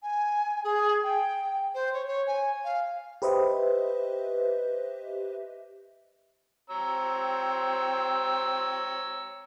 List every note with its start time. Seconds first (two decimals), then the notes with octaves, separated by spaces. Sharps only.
0.02 G#5
0.64 G#4
1.03 G5
1.74 C5
1.93 C#5
2.07 C#5
2.27 G#5
2.64 F5
3.22 G4 B4 C5 D#5 E5
6.70 C4 C#5 A#5 E6